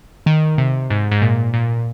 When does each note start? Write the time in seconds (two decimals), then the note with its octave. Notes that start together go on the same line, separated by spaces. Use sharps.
0.26 D#3
0.58 C3
0.90 G#2
1.11 G#2
1.22 A#2
1.54 A#2